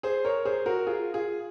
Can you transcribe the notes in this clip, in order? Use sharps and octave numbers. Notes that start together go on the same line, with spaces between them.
G#4 C5
A#4 C#5
G#4 C5
F#4 A#4
F4 G#4
F4 G#4